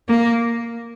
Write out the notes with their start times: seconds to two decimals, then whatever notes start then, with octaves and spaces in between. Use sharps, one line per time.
0.09 A#3